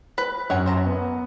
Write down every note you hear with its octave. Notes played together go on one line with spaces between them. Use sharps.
B4
F#2 C#5 F#5 G#5
C5 A5 A#5
B3